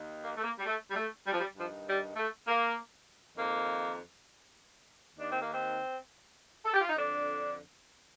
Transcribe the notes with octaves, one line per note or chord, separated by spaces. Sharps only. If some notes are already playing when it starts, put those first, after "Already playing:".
Already playing: D#2 D#3
A#3
A3
A#3
G3
A3
G3
A3
G3
F3
G3
G2 D#3 F3
G3
A3
A#3
F2 D#3 A#3
D#2 D#3 D4
C4
A#3
C4
A4
G4
F4
D#4
F2 D3 D4